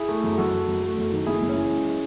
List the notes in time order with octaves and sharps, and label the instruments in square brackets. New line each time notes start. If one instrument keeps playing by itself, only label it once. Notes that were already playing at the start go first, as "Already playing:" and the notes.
Already playing: [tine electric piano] E4 G#4
[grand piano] A3
F#2
[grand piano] F#2 [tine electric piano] F#4 A4
[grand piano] A3
F#2
A3
F#2
D#3
[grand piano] F#1 [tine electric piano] E4 G#4
[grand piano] F#1
[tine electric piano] C#4
[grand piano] E3
G#3
G#3